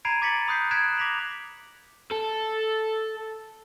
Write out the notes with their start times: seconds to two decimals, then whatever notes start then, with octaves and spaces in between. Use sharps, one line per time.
0.05 A#5 B5 G#6 C7 D7 D#7
0.22 D6 G#6 A6 B6 C#7 F#7
0.48 B5 D#6 F#6 G6 C7
0.71 F#6 G#6 B6 C7 D7 E7
0.98 D6 A#6 B6 F7 F#7
2.12 A4